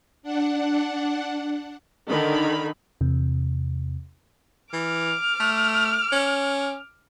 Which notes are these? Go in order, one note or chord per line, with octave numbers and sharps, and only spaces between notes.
D4 F#5
D3 D#3 B5
E2 C3
E3 D6 F6
A3
C#4